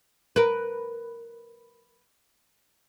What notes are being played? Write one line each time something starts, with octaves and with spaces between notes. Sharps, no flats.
A#4 B4